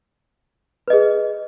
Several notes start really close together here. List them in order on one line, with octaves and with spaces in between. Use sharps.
B4 D#5 G#4